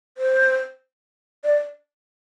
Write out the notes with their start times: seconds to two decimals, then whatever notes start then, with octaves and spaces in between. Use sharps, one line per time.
0.18 C5
1.44 D5